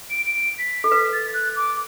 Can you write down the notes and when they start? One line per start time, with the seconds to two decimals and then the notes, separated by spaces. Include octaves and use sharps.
0.10 D7
0.27 D7
0.58 B6
0.84 A4
0.91 B4 B6
1.13 A6
1.34 F#6
1.56 D6